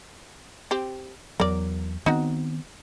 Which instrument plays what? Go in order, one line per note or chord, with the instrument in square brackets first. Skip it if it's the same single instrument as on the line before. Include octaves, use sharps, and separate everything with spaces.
[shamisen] C4 G4
[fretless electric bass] E2 F#3 [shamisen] A#4 D5
[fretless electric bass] D#3 B3 C4 [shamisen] D#4 F#4